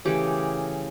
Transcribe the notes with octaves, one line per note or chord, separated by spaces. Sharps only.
C#3 E3 A3 G4